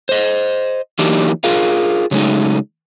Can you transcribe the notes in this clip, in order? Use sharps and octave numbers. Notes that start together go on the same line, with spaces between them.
C5 D#5
E3 F#3 A#3 D4 D#4 G4
F4 G#4 A#4 F5
C#3 F#3 G#3 A3 D#4